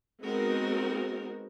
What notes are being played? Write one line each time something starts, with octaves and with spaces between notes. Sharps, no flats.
G#3 B3 C4 D#4 F#4 A#4